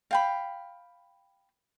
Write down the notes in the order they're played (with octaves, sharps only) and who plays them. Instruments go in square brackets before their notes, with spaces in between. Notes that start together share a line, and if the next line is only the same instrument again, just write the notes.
[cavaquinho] F5 G5 B5